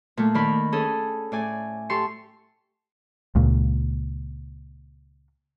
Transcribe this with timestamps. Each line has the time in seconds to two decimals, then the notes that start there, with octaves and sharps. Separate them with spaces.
0.17 A#2 A3
0.34 D#3 A#3 A#4 D5 B5
0.72 C#4 G#4 A4
1.32 A2 D5 G#5
1.90 G4 A4 C6 C#6
3.35 C#2 A#2